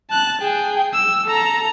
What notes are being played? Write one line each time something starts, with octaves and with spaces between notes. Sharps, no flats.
A5 F#6
G#4 G5
E6
A4 A#5